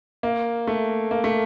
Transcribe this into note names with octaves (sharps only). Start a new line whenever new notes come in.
A#3
A3
A#3
A3